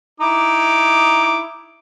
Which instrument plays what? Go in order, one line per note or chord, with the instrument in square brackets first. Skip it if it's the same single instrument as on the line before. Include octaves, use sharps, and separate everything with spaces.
[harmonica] D#4 E4 D6